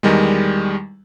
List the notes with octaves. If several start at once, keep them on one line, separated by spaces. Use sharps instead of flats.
E2 D#3 G3 G#3